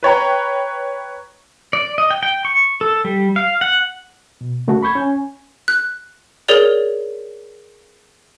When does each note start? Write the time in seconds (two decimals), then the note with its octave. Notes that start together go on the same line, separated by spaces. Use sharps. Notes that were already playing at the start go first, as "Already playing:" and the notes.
0.03 B4 C#5 G5 A#5
1.73 D5
1.98 D#5
2.11 G5
2.23 G5
2.45 C#6
2.81 A4
3.05 G3
3.36 F5
3.61 F#5
4.41 B2
4.68 C#3 A3 A#3 F#4 A4
4.82 B5 C#6 G6 G#6
4.95 C#4 G#5
5.68 F#6
6.48 G#4 A#4 C#5 D5 F7